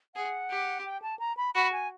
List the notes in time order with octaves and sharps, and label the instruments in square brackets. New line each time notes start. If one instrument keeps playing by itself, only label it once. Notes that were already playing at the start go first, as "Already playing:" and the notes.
[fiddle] G#4 [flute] F#5
[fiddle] G4
[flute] G5
A5
A#5
B5
[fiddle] F#4 [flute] B5
[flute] G#5